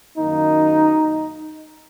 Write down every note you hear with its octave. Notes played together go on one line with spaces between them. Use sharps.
F#2 D#3 A#3 D#4